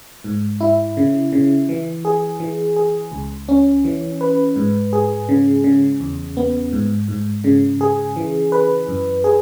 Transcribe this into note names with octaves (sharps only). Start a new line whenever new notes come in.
G#2
E4
C#3
C#3
E3
G#4
E3
G#4
C#2
C#4
E3
B4
G#2
G#4
C#3
C#3
E2
B3
G#2
G#2
C#3
G#4
E3
B4
F#2
G#4